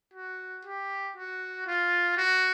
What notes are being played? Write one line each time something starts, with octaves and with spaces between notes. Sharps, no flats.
F#4
G4
F#4
F4
F#4